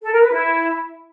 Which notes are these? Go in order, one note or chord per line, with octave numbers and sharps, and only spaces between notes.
A4
A#4
B4
E4